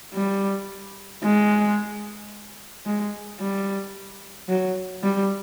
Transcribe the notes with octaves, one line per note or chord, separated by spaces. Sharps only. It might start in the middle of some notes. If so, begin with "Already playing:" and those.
G3
G#3
G#3
G3
F#3
G3